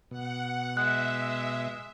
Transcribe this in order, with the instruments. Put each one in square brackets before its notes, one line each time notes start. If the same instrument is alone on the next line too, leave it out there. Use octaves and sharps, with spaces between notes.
[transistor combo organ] B2 [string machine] F#5
[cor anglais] G#3 [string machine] E5 [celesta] F#6